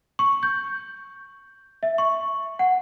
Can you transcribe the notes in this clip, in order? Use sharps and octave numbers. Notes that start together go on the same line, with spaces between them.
C#6
G6
E5
C#6
F#5